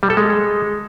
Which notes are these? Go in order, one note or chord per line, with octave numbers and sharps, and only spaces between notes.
G3
A4
G#3